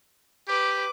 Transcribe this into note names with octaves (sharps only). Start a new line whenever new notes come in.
G4 B4 D6